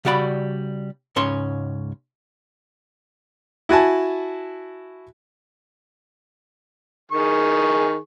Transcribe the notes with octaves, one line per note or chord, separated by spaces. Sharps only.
C#3 G3 F#4 D5 A5 B5
C#2 G#2 C#4 C#5 C6
E4 F#4 G#5 A5
D#3 G#4 C#6